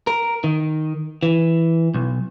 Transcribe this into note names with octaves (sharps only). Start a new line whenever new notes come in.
A#4
D#3
E3
B1